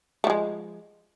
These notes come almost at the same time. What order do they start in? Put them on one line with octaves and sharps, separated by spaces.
A3 F3 G#3